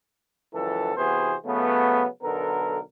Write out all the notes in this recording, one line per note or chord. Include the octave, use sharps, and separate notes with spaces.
C#2 F#2 E3 F3 A4
C3 E3 B3 F#4 G#4 C5
C#3 F#3 A3 B3
B1 D3 B3 A4 A#4